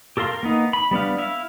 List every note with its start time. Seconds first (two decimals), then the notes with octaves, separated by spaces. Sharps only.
0.17 G4 A4 A#4 F5 C6
0.31 A#4
0.43 A#3 B3 D#4
0.73 B5
0.91 G3 B3 D4 F5
1.18 E4 E5 F5